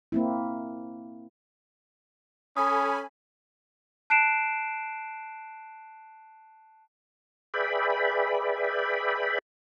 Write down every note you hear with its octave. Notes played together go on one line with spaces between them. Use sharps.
A#3 C4 E4
C#4 A4 G#5 B5 D#6
A5 F#6 C7 D7 E7
G#4 B4 D5 E5 G5 B5